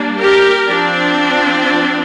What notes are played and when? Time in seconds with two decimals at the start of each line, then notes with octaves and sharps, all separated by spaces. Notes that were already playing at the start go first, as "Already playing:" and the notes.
Already playing: G3 A#3 D4
0.19 G4 A#4
0.70 F3 C4 D4